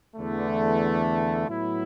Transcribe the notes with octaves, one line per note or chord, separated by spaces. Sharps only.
E2 D3 A3
A2 F#3 B3 E4